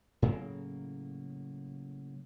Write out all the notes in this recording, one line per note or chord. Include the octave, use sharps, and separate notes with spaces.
A2 C#3 F#3 A#3